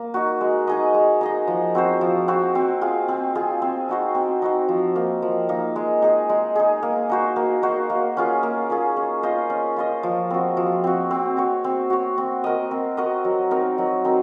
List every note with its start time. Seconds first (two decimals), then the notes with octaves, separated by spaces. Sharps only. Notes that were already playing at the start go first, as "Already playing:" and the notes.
Already playing: A#3
0.14 D#4 F#4
0.41 G#3
0.67 D#4 G#4 D#5
0.94 G#3
1.21 D#4 G#4 D#5
1.47 F3
1.75 C4 F#4 C5
2.01 F3
2.28 C4 F#4 C5
2.55 C4
2.81 F4 G#4
3.08 C4
3.35 F4 G#4
3.62 C4
3.89 D#4 F#4 C5
4.15 C4
4.42 D#4 F#4 C5
4.69 F3
4.96 A#3 D#4
5.22 F3
5.49 A#3 D#4
5.76 G#3
6.02 D#4 G#4
6.29 G#3
6.56 D#4 G#4
6.83 A#3
7.10 D#4 F#4 C5
7.36 A#3
7.62 D#4 F#4 C5
7.90 A#3
8.17 C#4 F4 G#4
8.43 A#3
8.70 C#4 F4 G#4
8.97 C#4
9.23 F4 C5 D#5
9.50 C#4
9.77 F4 C5 D#5
10.03 F3
10.30 C4 F#4
10.57 F3
10.84 C4 F#4
11.11 C4
11.37 F#4 C#5
11.64 C4
11.90 F#4 C#5
12.18 C4
12.44 F#4 A#4 D#5
12.71 C4
12.97 F#4 A#4 D#5
13.25 F#3
13.51 C4 D#4 A#4
13.78 F#3
14.05 C4 D#4 A#4